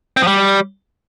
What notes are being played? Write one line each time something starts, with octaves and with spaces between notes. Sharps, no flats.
C4
F3
G3